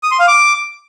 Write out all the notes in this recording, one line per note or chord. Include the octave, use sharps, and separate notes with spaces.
D#6
C6
F5
D6